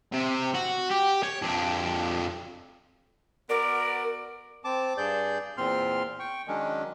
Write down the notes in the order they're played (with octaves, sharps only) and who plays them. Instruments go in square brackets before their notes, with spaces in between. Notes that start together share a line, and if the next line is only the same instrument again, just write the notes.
[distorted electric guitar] C3
F#4
G4
C#5
F2 D4
[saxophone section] B3 F#4 D5 [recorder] A#4
[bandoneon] C4 A5 D6
G2 G#4 D5 G6
E2 A#2 C4 C6 F6
G5 C#6
D#3 F#3 G#3 C#4 D4